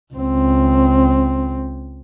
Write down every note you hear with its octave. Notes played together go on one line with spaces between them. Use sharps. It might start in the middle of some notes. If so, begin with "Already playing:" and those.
C#2 C4